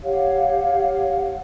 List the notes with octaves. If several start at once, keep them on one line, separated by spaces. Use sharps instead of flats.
G4 C#5 F5 F#5